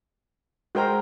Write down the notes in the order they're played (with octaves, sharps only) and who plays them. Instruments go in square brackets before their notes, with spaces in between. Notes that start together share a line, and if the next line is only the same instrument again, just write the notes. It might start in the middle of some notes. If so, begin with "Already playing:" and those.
[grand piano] G#3 G5 A#5 [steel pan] F#4 A#4 C5